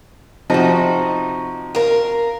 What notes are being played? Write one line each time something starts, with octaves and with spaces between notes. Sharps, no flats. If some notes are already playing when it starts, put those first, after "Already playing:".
C3 F3 D#4 F#4
A#4 F5